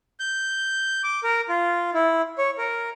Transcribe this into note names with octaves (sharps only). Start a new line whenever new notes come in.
G6
D6
A#4
F4
E4
C#5
A#4